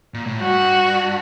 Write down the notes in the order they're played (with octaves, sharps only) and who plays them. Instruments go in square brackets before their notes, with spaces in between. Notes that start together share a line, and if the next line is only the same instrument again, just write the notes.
[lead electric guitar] A#2
A2
[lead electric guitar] G2 [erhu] F#4